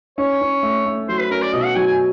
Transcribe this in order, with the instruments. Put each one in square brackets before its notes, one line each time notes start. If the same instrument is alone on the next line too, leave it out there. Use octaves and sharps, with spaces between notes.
[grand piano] C#4 [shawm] C#5
[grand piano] C#4
A3
A3
[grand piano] F#3 [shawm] C5
[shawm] B4
[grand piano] C#4 [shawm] A#4
[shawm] D5
[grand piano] B2 [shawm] D#5
[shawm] F#5
[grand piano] F#3 [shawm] G#5
[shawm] G#5